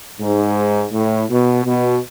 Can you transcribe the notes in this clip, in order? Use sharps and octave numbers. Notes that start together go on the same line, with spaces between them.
G#2
A2
B2
B2